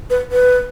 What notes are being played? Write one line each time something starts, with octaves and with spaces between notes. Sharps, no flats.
B4
B4